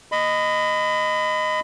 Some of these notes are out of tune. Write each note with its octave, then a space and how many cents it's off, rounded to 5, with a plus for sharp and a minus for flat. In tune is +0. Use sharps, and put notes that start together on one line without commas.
D#5 -5 B5 +30